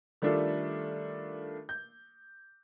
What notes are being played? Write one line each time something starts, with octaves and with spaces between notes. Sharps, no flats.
D#3 G3 A3 D4 F4 A4
G6